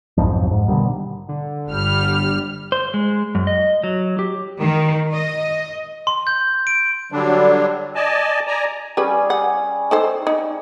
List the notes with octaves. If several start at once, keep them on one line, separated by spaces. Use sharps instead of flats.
B1 F2 G#2 F3
G#2
B2 D3 D#3 G3
D3
G1 G3 F6
C5
G#3
F#2
D#5
F#3
G4
D#3
D#5
C6
G6
D7
D3 F#3 G3 D4
D5 D#5 G#5 A5
D5 G#5 A#5
G3 C#4 G4 G#4 B4
F#5
D#4 A4 C5
D#4